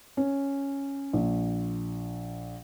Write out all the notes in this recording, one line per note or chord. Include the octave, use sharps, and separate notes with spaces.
C#4
A#1